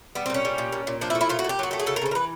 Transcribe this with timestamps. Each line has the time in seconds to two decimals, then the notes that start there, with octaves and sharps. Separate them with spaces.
0.15 G3 B3
0.26 C4
0.30 A#2 C#4
0.45 G3
0.58 A#2
0.72 A#2
0.87 A#2
1.01 F3 D4
1.10 E4
1.15 A3
1.21 E4
1.29 A#2 F4
1.39 F#4
1.44 A#2 G4
1.59 F#3 F#4
1.71 A3 G4
1.80 G#4
1.86 C#3 A4
1.96 A#4
2.02 C#3 C5
2.11 A#4
2.15 E3 B4